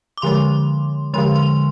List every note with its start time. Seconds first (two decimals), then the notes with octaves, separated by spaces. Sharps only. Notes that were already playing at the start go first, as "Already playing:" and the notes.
0.17 D6
0.22 D3 F3 G#3 C6
1.14 D3 F3 G#3 C6
1.35 C6